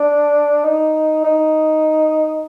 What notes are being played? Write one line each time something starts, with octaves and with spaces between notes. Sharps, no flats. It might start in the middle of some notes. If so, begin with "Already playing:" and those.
Already playing: D4
D#4
D#4